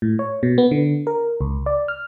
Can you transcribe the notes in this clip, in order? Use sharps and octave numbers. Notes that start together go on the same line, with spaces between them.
A2
C#5
B2
B3
D3
A#4
C#2
D5
F6